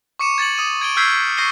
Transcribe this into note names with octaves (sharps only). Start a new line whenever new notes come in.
C#6 D6 C#7 D#7 E7
G#6 A6 C#7 F#7
D6 D#6 D#7
G#6 D7 G7
E6 F6 G6 G#6 B6 C7
C#6 G6 A#6 C7 D#7 G7